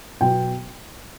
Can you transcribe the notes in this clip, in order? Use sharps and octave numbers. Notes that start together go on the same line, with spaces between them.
B2 F#3 B3 G5